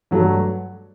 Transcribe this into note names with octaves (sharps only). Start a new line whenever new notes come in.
G2 F#3 A3